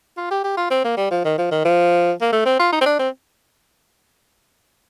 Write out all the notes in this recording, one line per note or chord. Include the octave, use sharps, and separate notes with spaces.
F4
G4
G4
F4
C4
A#3
G3
F3
D#3
F3
D#3
F3
A#3
A3
C4
F4
D#4
C4
D4
C4